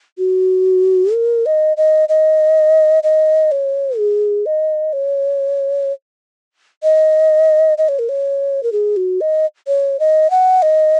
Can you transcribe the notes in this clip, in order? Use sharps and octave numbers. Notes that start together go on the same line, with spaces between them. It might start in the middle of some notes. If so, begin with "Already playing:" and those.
F#4
A#4
D#5
D#5
D#5
D#5
C#5
G#4
D#5
C#5
D#5
D#5
C#5
A#4
C#5
A#4
G#4
F#4
D#5
C#5
D#5
F#5
D#5